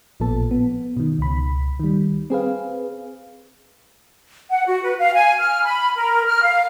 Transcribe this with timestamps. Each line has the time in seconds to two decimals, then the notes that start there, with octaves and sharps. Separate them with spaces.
0.20 A1 A#2 F3 B3 A4 A5
0.51 B3
0.97 B2 D#3
1.19 C#2 B5
1.80 D#3 G3
2.30 C4 G#4 B4 F5
4.50 F#5
4.66 F#4
4.83 B4
4.98 F5
5.14 G#5
5.39 F6
5.65 B5
5.96 A#4
6.27 F6
6.43 F5